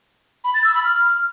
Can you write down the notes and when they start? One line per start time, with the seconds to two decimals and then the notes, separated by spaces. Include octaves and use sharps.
0.44 B5
0.54 A6
0.64 E6
0.74 B5
0.84 F6